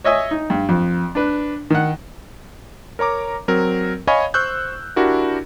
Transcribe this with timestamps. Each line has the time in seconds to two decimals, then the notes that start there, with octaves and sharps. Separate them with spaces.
0.04 C#5 D#5 E5 G#5
0.31 D#4
0.50 G2
0.69 F2
1.15 D4 B4
1.70 D#3 F#5
2.99 A#4 C#5 A#5 D6
3.48 F#3 C4 A#4
4.07 C#5 D#5 F5 G#5 B5 C#6
4.34 C5 C#6 E6 F#6 G6
4.96 D4 E4 F#4 G4 A#4